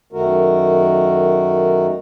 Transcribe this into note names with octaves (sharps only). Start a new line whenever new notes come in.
F#2 D#3 A3 F#4 A#4